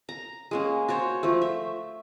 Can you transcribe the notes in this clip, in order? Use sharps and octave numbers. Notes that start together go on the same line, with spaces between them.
A#5
G#3 A#3 C#4
F#4 C5 C#5
F3 A3
E5